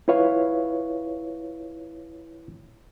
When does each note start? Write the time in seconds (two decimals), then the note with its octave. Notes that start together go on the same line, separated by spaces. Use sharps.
0.08 E4 F4 B4 C#5 F5